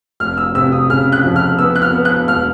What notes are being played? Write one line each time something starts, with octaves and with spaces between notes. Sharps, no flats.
F1 F6
E6
C3 E6
D#6
C#3 F6
F#6
F2
F6
B3 E6
F#6
F6
B3
F#6
E1 F6